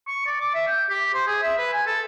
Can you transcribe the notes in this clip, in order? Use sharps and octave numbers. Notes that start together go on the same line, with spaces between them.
C#6
D5
D6
E5
G5
G4
C5
G#4
E5
B4
G#5
A4